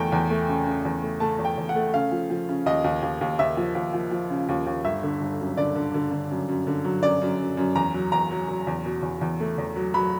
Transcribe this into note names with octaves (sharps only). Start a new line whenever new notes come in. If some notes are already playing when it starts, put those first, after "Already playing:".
Already playing: E2 F#3 A3 G5
E2
A3
C#3
C#3
E2
A3
A3 A5
E2
G5
E2
F#5
A3
C#3 F5
F3
F3
C#3
D#2 D#5
D#2
D#2
D#2
D#2 E5
F3
D#2
F3
F3
C#3
D#2
D#2
G1 E5
D3
G1
F#2
D3 D5
D3
D3
D3
F#2
F#2
D3
F#3
F#2 D5
F#2
F#2
F#2
E2 A#5
F#3
E2 A#5
F#3
F#3
E2
B2
E2
E2
A3
E2
F#3
F#3 B5